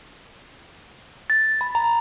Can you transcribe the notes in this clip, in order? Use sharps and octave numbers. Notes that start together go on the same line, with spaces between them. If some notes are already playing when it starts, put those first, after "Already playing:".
A6
B5
A#5